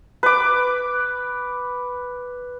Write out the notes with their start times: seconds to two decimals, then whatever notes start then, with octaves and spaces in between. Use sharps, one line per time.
0.23 B4 D6